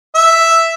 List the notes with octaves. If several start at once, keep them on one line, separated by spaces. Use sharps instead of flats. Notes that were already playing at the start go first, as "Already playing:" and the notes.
E5